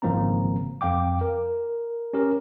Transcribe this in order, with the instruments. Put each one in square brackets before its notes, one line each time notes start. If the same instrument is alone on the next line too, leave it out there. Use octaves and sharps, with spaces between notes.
[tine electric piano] G#1 C#3 F3 A#3 C4 A#5
F2 F5 G5 D6
A#4
C#4 G4 A#4